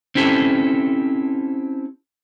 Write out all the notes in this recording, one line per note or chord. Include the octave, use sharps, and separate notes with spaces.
C4 C#4 E4 G4 A4